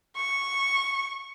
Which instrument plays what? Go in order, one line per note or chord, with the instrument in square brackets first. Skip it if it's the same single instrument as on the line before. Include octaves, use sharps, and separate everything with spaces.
[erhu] C#6